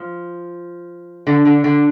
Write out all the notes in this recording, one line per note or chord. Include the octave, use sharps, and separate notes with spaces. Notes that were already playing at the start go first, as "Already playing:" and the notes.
Already playing: F3
D3
D3
D3